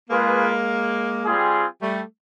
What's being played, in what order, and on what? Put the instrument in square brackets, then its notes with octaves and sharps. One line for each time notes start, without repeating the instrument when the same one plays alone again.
[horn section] G#3 A#3 [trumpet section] F4 G#4 B4
[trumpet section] G3 C4 F4 G#4
[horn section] G3 A3